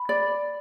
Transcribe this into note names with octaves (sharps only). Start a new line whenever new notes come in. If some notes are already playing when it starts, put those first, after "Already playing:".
Already playing: B5
D5